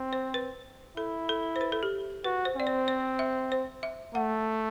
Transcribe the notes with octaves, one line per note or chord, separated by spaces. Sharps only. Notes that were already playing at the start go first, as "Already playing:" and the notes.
Already playing: C4
C5
B4
E4 A4
A4
C5
B4
A4
G4
F#4 B4
C5
C4 D5
C5
C5
E5
C5
E5
A3 F#5